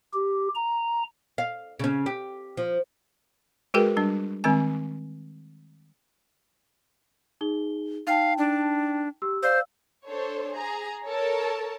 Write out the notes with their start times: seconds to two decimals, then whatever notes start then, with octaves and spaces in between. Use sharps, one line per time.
0.13 G4
0.55 A#5
1.38 F5
1.79 C#3 C#4
2.06 G4
2.57 F3
3.74 G#3 F#4 G#4 A#4 B4 G5
3.97 G3 D4
4.44 D#3 G#3 C4 G#5
7.41 D#4 G#4 G7
8.07 D#4 F5 G5 A5
8.38 D4
9.22 G4 E6
9.43 C5 D5 F5 E6
10.06 D4 A4 C5 C#5
10.54 G#4 A#5
11.09 A4 A#4 C#5 A5